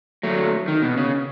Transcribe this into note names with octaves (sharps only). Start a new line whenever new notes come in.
F#3 A3
D#3
B2
C#3